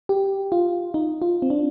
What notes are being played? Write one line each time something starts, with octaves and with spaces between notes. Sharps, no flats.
G4
F4
D#4
F4
C4
D4